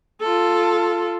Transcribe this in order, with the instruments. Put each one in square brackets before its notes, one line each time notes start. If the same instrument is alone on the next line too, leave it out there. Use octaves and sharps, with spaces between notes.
[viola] F4 A4